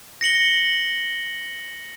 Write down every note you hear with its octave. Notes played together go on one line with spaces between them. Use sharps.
A#6 C#7 F#7 G7